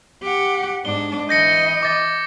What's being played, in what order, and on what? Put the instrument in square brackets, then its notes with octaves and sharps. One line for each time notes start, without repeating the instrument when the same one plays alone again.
[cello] G4 F#5
[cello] G#2 D4 [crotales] G7
[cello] E3 D#5 [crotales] G6 A#6 C#7
[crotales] D6 A6 A#6